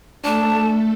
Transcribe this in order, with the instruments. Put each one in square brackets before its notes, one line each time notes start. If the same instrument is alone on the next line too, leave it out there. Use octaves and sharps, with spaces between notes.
[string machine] A3 A4 [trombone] D4 [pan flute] A5